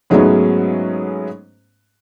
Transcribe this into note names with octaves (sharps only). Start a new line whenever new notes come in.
G#2 F#3 G#3 A3 B3 C#4